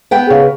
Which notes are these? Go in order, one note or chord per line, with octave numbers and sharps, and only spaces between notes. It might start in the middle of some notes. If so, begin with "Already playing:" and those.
B3 G5
C#3